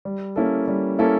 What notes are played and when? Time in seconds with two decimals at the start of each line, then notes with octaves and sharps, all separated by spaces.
0.05 G3
0.36 A#3 C#4 E4 A4
0.68 G3
0.99 A#3 C#4 E4 A4